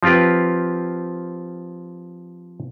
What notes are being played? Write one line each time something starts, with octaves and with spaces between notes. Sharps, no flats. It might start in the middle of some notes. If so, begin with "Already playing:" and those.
F3 C4 F4 G4 B4